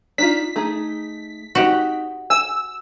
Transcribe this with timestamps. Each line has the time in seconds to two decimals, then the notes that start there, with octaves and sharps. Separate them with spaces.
0.18 D4 D#4 F4 B6
0.56 A3 D#4 G#4
1.55 C4 D#4 F#4 G4
2.30 G#5 E6